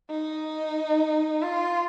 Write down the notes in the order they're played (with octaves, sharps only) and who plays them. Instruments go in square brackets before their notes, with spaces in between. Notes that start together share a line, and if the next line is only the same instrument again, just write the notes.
[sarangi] D#4
F4